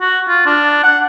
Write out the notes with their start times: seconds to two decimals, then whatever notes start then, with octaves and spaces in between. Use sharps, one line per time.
0.01 F#4
0.28 F4
0.46 D4
0.83 F#5